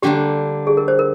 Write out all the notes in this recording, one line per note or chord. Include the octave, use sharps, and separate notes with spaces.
D3 G3 A#3 D4 G4
G#4
A#4
C5
A#4